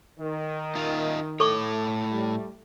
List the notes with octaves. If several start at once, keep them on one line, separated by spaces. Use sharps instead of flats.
D#3
D#4 F4
A2 A4 C#5 C#6 D6
G3 A3